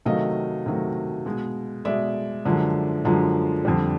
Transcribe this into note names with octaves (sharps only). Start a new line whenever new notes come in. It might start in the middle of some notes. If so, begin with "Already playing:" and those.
C3 D#3 F#3 A3 D#5 F5
C3 D#3 F#3 A3
B2 G#3
B2 G#3 D5 E5
F#2 D3 F3 G#3
F#2 D3 F3 G#3
F2 D3 G3